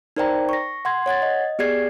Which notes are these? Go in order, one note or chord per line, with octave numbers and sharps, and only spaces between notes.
D#4 A#4 C5 D5 G5 A#5
C#6 A#6
F#5 C6 G#6
C#5 F#5 G#6 A6
D#5
B3 G4 G#4 D5 G#6 C7